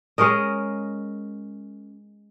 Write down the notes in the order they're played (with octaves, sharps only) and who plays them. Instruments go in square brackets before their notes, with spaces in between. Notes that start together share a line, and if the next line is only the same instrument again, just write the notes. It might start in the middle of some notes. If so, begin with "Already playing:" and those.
[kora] G#3 C#4 A#4 D#5